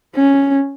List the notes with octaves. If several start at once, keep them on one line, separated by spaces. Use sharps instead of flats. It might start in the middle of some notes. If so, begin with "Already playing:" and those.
C#4